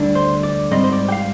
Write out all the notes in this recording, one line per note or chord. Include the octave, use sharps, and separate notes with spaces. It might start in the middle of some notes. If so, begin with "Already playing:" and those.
Already playing: D2 D3 G3 D4
C5
D5
G#2 G3 C4 D#5
C5
D5
G5
F5